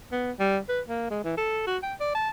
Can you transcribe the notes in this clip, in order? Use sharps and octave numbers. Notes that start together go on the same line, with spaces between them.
B3
G3
B4
A#3
G#3
E3
A4
F#4
G5
D5
A5